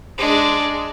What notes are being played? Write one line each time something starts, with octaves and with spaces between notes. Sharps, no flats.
G#3 D4